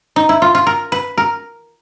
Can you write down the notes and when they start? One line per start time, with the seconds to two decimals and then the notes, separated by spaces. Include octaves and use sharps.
0.16 D#4
0.29 E4
0.42 F4
0.55 F4
0.67 A#4
0.92 B4
1.18 A#4